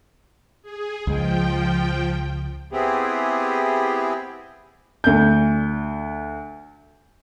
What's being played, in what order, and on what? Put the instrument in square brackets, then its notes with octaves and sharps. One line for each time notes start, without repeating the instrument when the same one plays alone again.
[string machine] G#4
[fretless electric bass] C#2 G#3 [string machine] F3 G5
[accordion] B3 C4 E4 G4 G#4
[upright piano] D2 G6